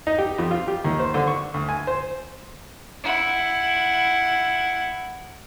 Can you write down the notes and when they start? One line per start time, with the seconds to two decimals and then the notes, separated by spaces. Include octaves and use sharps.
0.07 D#4
0.18 G4
0.38 F2
0.51 F4
0.68 G4
0.85 D#2
1.00 C5
1.14 D3
1.27 C#6
1.54 D2
1.69 G#5
1.87 C5
3.04 E4 F#5